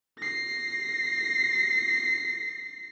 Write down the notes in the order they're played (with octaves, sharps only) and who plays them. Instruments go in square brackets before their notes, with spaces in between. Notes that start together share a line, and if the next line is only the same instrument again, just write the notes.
[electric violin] A#6 C7